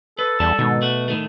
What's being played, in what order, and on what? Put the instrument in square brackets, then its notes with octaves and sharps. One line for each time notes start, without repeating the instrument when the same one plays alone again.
[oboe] A4 [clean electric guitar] B4
[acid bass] E2 [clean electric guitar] G3 A5
[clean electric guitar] G#2 D#3 [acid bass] B2
[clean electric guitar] A3 F#4
A2 D#3 A3